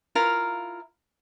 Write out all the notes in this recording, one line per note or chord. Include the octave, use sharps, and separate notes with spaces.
E4 F4 A#4 F5